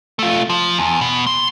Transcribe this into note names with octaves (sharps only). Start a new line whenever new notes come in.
A3 F4
F3
E2
B2
C6